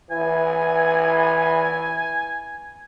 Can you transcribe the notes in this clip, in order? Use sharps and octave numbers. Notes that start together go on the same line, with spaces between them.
E3 G#5